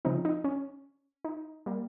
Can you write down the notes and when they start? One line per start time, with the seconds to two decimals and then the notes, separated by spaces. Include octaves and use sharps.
0.05 C#3 F3 C4 D#4
0.25 D#4
0.44 C#4
1.25 D#4
1.66 G3 A#3